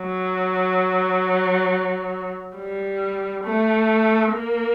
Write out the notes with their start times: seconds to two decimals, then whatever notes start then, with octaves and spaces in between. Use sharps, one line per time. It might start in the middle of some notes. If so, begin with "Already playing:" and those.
Already playing: F#3
2.57 G3
3.44 A3
4.33 A#3